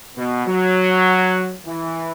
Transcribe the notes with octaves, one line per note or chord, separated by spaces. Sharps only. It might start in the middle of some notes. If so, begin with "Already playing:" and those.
B2
F#3
E3